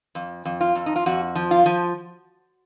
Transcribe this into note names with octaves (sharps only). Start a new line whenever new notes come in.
F2
F2
F4
F2
D#4
F4
F2 F#4
F3
F4
F3